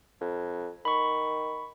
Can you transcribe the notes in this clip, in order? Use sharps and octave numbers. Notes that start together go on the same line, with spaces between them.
F2
D#3 B5 C#6